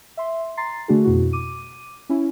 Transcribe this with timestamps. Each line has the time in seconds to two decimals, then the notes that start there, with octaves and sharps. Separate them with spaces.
0.17 E5 C6
0.57 A#5 C6 A6 C7
0.88 D3 A3 D4 F#4 G#4
1.05 F2 B2 E4 F#4
1.33 D6 D#7
2.09 C#4 E4